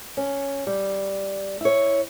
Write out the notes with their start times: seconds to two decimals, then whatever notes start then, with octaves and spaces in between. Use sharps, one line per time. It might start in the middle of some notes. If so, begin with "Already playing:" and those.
0.17 C#4
0.67 G3
1.61 E4 C#5